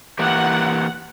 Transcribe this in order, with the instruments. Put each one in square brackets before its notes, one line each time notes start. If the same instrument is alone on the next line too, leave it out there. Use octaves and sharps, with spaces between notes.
[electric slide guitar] E3 A#3 G4 [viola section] F#5